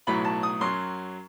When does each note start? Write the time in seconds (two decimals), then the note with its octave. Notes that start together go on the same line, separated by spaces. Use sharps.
0.07 B1 A2 F#3 B5
0.25 A5
0.43 D#6
0.61 F#2 F#3 C6